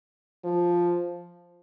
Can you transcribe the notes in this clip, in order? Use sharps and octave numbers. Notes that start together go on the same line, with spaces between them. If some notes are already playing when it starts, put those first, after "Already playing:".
F3